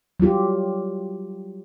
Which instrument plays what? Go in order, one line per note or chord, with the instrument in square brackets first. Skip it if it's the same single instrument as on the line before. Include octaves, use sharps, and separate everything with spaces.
[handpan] F#3 G3 F4 G4